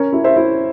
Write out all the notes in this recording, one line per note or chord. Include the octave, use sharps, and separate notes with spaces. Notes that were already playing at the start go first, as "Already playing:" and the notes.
Already playing: C#4 A#4 C#5
E4
C5 E5
E4